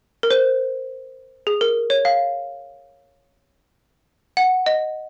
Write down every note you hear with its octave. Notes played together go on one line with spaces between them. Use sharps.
A#4
C5
G#4
A#4
C#5
F5
F#5
D#5